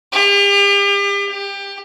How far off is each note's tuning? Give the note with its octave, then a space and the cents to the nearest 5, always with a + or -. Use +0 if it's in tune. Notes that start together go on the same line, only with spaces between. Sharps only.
G4 +40
G4 +20